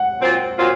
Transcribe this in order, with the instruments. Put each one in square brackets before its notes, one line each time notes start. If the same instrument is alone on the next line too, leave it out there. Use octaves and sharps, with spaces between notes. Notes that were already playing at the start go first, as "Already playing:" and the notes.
Already playing: [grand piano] F#5
[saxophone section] A#2 F#3 C4 F4
A#2 F#3 C4 F4